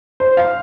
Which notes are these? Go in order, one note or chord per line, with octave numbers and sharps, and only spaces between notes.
C5
F5